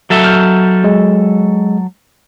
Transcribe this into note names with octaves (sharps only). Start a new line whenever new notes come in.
F#3 A4 E5
F6 G6
G#3